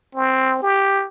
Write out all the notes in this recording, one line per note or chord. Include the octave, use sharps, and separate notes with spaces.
C4
G4